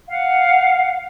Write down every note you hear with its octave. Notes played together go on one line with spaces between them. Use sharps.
F5 F#5